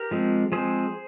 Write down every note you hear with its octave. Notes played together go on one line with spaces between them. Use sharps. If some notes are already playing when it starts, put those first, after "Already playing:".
Already playing: G4 A#4
F3 G#3 C4
F3 G#3 C4 G#4 C5